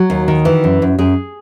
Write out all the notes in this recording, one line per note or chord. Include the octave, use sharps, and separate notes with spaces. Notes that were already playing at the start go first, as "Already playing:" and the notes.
Already playing: F#3 F#4
D#2
D#3
E3
F#2
F#2
F#2 G#4